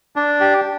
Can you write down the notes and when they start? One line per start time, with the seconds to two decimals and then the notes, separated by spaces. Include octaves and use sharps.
0.16 D4
0.40 G4